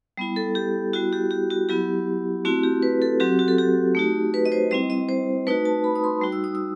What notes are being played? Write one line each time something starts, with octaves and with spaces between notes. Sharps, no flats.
G3 B3 E4
A4
G4
G3 B3 E4 F#4
G4
G4
F#4
F#3 B3 E4 G4
A3 C4 E4 F#4
G4
B4
A4
F#3 C4 F#4 G4
F#4
A4
G4
A3 D#4 F#4
B4
D#5
C5
G3 C4 E4 D#5
D#5
C5
A3 D#4 F#4 B4
A5
B5
D#6
C6
G3 D#4 F#4
E6
D#6
E6